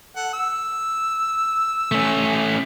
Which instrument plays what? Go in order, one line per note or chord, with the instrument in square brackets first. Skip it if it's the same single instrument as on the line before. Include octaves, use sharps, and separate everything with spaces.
[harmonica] A4 F#5
E6
[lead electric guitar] A3 C#4